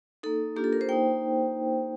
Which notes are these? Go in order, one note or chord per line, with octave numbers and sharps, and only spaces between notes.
A#3 D#4 A4
A#3 D4 F4 G4
A4
A#4
C5
A#3 D#4 G5